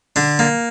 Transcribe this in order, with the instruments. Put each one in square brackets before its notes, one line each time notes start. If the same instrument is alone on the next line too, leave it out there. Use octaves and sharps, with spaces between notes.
[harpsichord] D3 D4
A#3